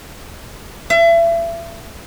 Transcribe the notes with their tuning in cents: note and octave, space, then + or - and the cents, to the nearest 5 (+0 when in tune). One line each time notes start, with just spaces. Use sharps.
E5 +35